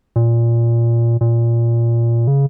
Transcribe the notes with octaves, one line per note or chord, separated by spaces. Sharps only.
A#2
A#2
C#3